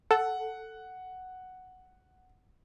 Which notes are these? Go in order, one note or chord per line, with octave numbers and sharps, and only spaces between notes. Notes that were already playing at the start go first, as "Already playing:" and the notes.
A4 F#5